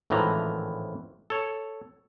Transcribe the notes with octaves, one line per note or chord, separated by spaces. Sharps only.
G#1 A2 D3 E3 F3 A#5
A4 C#5